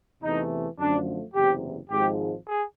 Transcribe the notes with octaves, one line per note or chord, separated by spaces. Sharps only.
E2 C3 E3 A3 D#4
F#2 D3 F3 A3 D4
F#1 E2 C3 G4
G#1 G#2 F3 G#3 G4
G#4